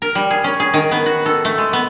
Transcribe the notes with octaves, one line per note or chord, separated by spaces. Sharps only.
A#4
G3
G#4
C#4
G#4
D#3
B3
F#4
A4
A3
G#3
B3